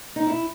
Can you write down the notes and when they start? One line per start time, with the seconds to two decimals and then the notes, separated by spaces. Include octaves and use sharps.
0.16 D#4
0.27 E4